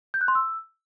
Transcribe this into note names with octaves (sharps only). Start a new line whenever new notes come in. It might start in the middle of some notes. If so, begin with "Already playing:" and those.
G6
F#6
C6
E6